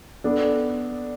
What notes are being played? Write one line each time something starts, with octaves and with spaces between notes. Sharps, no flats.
B3 D4 A4